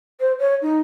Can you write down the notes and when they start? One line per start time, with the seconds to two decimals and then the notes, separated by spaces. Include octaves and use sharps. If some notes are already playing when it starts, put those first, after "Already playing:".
0.20 C5
0.39 C#5
0.62 D#4